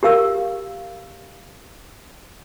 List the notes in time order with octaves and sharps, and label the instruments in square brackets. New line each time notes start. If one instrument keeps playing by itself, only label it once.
[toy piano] G4 A#4 F5 E6